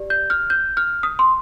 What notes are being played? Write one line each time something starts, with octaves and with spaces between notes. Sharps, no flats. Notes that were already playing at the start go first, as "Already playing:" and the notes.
Already playing: G4 D5
G6
F6
G6
F6
D#6
C6